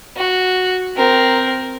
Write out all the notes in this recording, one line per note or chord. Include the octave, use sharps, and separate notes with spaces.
F#4
C4 A#4